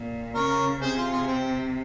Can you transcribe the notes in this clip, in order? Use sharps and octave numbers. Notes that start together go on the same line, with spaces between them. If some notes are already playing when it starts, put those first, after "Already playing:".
Already playing: A#2
C#3 A#4 C#5
C3 G#4 C5
F4 G#4
F4 G#4
C4